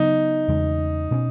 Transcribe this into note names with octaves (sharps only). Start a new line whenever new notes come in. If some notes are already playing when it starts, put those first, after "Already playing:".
Already playing: C#3 F#3 B3 D#4
E2 C#3 G#3 C#4
B2 A#3 C#4